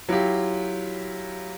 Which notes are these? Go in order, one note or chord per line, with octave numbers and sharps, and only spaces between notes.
F#3 E4 F4 G4